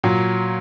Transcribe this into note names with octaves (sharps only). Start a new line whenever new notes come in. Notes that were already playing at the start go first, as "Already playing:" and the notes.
A#2 F#3